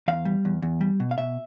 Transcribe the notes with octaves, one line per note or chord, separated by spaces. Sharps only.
E2 F5
G3
E2
E2
G3
B2
F5
B2 E5